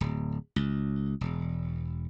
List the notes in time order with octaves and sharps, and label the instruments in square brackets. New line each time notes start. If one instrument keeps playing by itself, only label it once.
[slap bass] D1
C#2
E1